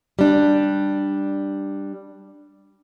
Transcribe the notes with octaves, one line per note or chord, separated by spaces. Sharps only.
G3 D4